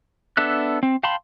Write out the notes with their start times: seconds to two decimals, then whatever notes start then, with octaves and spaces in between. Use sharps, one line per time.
0.37 B3 D4 A4 E5 F#6
0.83 C4
1.03 F5 G5 A5 B5 C6